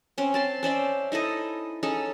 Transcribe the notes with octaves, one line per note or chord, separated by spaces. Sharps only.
C4 C#4
C4 A5 C6
C#4 C5 D5 E5
D#4 E4 A4 D#5
C#4 D#4 G#4 A4